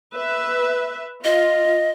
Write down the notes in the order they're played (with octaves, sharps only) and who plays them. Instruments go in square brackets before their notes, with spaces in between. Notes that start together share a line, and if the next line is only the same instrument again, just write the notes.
[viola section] B4 E5
[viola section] F4 [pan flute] D#5